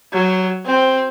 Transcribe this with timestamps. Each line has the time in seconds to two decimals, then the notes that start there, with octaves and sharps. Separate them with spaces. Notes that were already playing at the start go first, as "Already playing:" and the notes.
0.13 F#3
0.66 C4